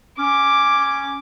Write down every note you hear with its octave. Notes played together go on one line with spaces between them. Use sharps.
C#4 D6